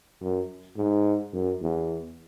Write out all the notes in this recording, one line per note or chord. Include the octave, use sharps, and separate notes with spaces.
F#2
G#2
F#2
E2